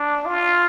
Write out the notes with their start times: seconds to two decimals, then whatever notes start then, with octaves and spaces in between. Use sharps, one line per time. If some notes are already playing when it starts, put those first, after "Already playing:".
Already playing: D4
0.26 F4